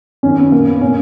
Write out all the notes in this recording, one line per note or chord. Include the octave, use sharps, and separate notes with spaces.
F#2 D#3 C#4
B3
A#2 A#3
B3
A#2 C#4